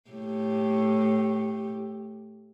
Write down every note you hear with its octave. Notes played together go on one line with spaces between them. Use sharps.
A2 A3 G4